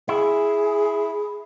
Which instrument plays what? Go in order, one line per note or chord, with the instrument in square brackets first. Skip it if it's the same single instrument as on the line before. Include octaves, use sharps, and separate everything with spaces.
[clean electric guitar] E4 [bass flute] G#4